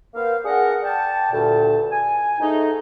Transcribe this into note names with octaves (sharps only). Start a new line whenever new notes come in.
A#3 B3 C5 F5
D4 G#4 A#4 F#5
D5 G5 A5
D2 G2 A#2 A5
G#5
G#2 A3 D#4